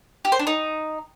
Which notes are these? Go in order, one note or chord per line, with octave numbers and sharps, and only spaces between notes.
G4
C5
D4
D#4